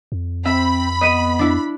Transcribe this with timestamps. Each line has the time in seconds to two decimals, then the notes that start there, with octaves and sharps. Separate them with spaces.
0.12 F2
0.46 C4 E5 B5
1.01 B3 D#5 B6 D#7
1.39 D4 E4